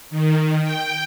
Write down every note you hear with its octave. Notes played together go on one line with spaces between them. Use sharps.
D#3
G5